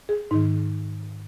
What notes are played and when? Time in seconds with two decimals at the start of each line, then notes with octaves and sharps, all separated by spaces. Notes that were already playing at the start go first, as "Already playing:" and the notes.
0.09 G#4
0.31 G#2 D#3 D#4